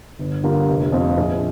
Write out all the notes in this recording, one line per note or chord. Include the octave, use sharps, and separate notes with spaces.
G1
G2 D3 A#3 F4
F1
F2 F3 C4 F4
A#1